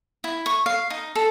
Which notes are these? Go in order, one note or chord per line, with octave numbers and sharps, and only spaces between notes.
E4
C#6
F5
D#4
A4